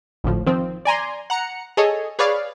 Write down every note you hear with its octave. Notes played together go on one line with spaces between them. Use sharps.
G#1 D2 A2 F3
D#3 F3 C4
D5 G#5 A#5 C6
F#5 A#5 C#7
G#4 A4 C#5 D#5
G#4 B4 C#5 D5 F5